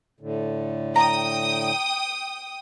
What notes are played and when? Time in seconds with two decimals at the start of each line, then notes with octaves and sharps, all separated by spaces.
0.20 A2 D3
0.96 G5 A#5 D#6